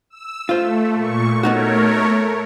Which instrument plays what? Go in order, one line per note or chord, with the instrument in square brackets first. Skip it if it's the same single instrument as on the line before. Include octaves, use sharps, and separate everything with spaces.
[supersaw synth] E6
[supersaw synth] A3 [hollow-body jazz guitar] F4 C5
[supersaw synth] A#2 C#6
[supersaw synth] A3 A#4 C#5 [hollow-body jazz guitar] B3 D#4 F#4